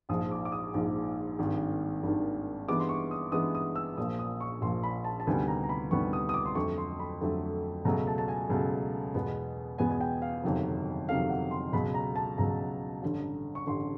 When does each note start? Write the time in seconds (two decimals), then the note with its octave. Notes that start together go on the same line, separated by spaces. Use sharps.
0.09 A#1 G#2 F3 D#6
0.31 D6
0.45 D6
0.52 D#6
0.74 A#1 G#2 F3
1.39 G#1 G2 D#3
2.03 G#1 G2 D#3
2.69 G2 E3 G#3 B3 D6
2.80 C6
2.89 C#6
3.11 D#6
3.32 G2 E3 G#3 B3 D#6
3.55 D#6
3.75 E6
3.97 A#1 A#2 F3 D#6
4.19 D#6
4.41 C#6
4.61 A#1 A#2 F3 C6
4.83 B5
5.04 A5
5.20 A5
5.27 D2 C3 D#3 G3 B3 G#5
5.48 A#5
5.63 A#5
5.69 B5
5.91 D2 C3 D#3 G3 B3 C#6
6.13 D#6
6.29 D#6
6.34 D6
6.46 C6
6.55 F2 D3 F#3 A3 C#6
6.78 C6
6.99 B5
7.21 F2 D3 F#3 A3
7.85 C#2 B2 F#3 A3 A#5
8.07 A5
8.18 A5
8.28 G#5
8.50 C#2 B2 F#3 A3
9.14 E2 B2 G#3 B3
9.78 E2 B2 G#3 B3 G#5
9.91 G#5
10.01 G5
10.22 F5
10.44 G1 F2 C3 D#3 F#3
11.09 G1 F2 C3 D#3 F#3 F5
11.30 F#5
11.51 C6
11.72 C#2 B2 F#3 B5
11.94 A#5
12.16 A5
12.38 C#2 B2 F#3 A#5
13.02 A1 G2 D3
13.55 C#6
13.67 A1 G2 D3 C6